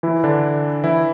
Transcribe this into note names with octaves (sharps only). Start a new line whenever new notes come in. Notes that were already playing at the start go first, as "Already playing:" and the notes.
E3 E4
D3 D4
E3 E4